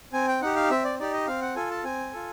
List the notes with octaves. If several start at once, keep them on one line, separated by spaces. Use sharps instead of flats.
C4 G#5
G5
D#4 G4 F#5
F5
C4 E5
D5
D#4 G4 D5
D#5
C4 F5
F#5
F4 A4 G#5
A5
C4 G#5
F4 A4